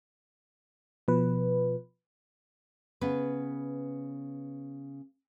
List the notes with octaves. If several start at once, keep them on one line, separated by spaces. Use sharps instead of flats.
B2 F3 B4
C#3 B3 B4